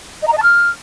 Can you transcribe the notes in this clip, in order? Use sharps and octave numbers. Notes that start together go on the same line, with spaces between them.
D#5
A#5
D#5
A5
F6